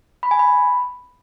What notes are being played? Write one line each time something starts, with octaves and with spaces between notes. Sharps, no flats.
B5
G#5
B5